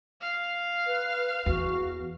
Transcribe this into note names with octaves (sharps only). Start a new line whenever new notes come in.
F5
B4
E2 F#4